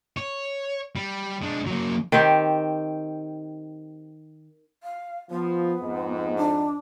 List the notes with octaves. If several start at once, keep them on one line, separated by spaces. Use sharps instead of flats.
C#5
G3
G#3 D4
F#3 A#3
D#3 C4 G4
F5
F3 B3
F2 G#2
D4